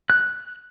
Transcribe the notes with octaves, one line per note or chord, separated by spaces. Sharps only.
F#6